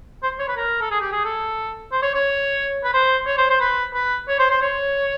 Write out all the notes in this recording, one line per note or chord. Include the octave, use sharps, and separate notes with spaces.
C5
C#5
B4
A#4
A4
G#4
G4
G#4
A4
C5
C#5
C#5
B4
C5
C#5
C5
C5
B4
B4
C#5
C5
C5
C#5